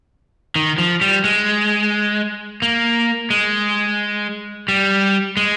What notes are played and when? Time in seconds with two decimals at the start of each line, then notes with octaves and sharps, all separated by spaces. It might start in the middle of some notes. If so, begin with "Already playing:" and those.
0.56 D#3
0.78 F3
1.01 G3
1.24 G#3
2.62 A#3
3.30 G#3
4.68 G3
5.37 G#3